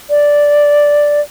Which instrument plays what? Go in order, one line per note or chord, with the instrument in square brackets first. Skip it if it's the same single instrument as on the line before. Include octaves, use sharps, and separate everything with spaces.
[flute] D5